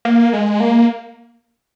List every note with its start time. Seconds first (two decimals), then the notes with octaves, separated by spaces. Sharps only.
0.05 A#3
0.33 G#3
0.60 A#3